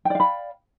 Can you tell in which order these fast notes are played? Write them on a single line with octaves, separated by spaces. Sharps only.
G5 D5 F5 B5